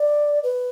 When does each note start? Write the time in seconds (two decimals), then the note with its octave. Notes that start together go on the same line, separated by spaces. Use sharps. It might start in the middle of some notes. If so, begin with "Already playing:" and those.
Already playing: D5
0.43 B4